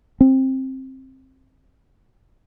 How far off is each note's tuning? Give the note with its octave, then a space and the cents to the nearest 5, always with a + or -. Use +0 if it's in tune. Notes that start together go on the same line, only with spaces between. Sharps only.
C4 +15